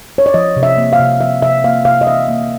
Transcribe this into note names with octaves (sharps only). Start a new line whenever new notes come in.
C#5
D5
F3 D#5
C3
E5
A#3
F5
C3
F3 E5
C3 E5
A#3 F5
C3 F5
D#5
E3 E5
A#3